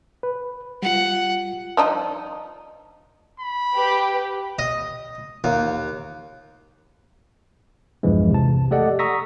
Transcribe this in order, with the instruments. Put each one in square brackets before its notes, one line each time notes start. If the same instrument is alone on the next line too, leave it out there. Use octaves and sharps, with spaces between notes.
[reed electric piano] B4
[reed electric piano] G3 F4 [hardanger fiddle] F#5
[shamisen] F3 D4 D#4
[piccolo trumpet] B5
[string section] G4 B4
[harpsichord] D#5
D#2
[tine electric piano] B1 E2 G2 E3 F3 G#3
C3 A5
A3 G4 A4 D5 D#5 F#5
A#5 C#6 D#6 E6 A#6 B6